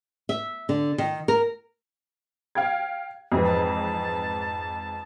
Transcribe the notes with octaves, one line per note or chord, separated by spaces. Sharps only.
E5
D3
D#3
A#4
F5 G5 G#6
F2 G#2 E3
A5